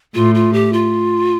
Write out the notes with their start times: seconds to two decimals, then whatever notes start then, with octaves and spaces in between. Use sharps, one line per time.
0.15 A2 F4
0.35 F4
0.53 G4
0.73 F4